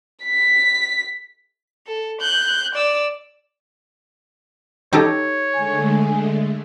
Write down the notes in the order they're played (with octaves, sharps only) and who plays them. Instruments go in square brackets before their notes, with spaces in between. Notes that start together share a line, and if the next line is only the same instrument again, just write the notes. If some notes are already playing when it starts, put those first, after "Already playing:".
[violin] B6
A4
F#6 G6
D5 E6
[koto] D#4 G4 A4 [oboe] C#5
[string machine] D3 G#3 A3 [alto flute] G#5